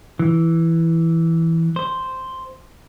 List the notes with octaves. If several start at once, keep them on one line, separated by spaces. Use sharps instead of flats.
E3
C5